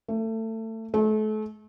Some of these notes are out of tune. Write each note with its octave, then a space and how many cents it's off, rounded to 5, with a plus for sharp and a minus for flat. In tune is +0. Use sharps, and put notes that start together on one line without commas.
A3 +25
A3 -35